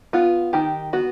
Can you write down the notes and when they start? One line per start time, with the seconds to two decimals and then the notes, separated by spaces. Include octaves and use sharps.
0.13 B3 F4
0.53 D#3 G4
0.93 B3 F#4